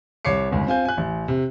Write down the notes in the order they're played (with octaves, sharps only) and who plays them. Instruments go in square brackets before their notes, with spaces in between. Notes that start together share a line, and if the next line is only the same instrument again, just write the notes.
[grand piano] C2 C#5 D6 C7 C#7
G1 C#2
C4 F4 G#5 G6
G#5 F#6
A1
C3